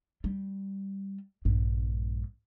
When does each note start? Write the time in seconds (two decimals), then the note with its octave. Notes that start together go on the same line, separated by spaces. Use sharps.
0.24 G3
1.45 A#1 G2